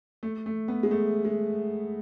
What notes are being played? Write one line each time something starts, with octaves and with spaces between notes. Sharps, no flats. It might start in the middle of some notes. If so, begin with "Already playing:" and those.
A3
A3
B3
G#3
A3
G#3